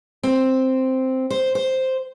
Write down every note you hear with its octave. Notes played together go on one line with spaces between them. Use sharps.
C4
C5
C5